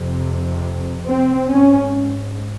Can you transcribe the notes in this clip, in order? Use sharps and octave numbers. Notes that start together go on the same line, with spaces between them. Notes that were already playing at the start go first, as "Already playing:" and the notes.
Already playing: F2 C3
C4
G#2 C#4